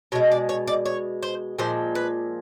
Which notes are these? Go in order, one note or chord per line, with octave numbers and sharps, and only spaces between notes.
B2 G#3 C#5
D5
C#5
D5
C#5
C5
A#2 F3 G#3 C5
B4